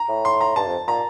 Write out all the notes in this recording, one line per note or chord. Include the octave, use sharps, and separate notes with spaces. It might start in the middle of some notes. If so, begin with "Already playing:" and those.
Already playing: A#5
A2
C6
A#5
G2 A5
F2
A#2 A#5